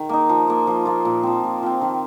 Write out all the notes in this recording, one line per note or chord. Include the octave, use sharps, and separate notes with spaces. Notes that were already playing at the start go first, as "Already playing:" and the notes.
Already playing: D#3
A#3 D#4
F3
A#3 F4
F3
A#3 F4
A#2
F3 C4
A#2
F3 C4
D#3